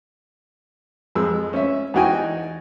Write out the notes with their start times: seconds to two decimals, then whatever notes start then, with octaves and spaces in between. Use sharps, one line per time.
1.15 F2 G#3 E6
1.53 C#4 C#5 E5
1.94 E2 D#4 F#4 G5 G#5